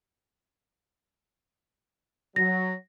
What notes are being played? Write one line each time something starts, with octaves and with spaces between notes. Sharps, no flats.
F#3 A#6